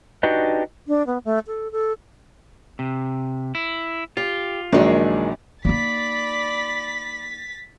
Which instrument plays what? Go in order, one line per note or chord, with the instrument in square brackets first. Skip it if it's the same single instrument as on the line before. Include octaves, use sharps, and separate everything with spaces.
[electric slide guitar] D4 D#4 F#4 G4 B4 D#5
[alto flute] D4
B3
A3
A4
A4
[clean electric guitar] C3
E4
[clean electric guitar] F4 [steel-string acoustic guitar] G4
[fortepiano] A#1 F#3 D4 [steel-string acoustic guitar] D#3 G#3
[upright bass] A#3 D#4 [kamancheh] D5 B5 [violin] A6 B6